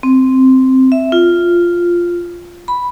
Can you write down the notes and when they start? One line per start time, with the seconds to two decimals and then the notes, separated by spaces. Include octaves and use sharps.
0.03 C4
0.92 E5
1.12 F4
2.68 B5